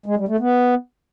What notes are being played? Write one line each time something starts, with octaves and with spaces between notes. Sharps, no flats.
G#3
G3
A3
B3